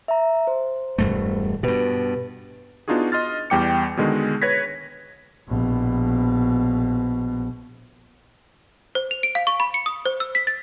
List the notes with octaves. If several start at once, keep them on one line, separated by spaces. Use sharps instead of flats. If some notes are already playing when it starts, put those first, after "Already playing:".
E5 A#5
C5
E1 G2 A3
G2 B2 G4 B4
B3 D4 D#4 F4 F#4 G#4
D#5 C6 F6 A6
E2 G3 G5 D6 C#7
B2 D3 D#3 G#3
B4 C#5 G#6 A#6 B6
A#1 B2
C5
F7
D7
F5
C#6
B5
C#7
D#6
C5
E6
B6
A6